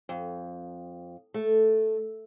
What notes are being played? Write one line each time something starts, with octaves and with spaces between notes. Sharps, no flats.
F2
A3